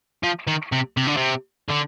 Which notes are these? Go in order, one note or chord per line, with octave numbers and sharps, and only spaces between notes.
F3
D#3
C3
C3
D3
C3
D3